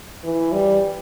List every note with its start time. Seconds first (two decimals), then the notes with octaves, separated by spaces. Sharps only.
0.24 E3
0.53 G3